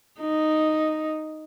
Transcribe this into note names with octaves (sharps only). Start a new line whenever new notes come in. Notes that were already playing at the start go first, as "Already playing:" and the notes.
D#4